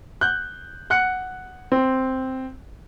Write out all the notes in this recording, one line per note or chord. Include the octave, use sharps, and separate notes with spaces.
F#6 G6
F#5 F#6 C#7
C4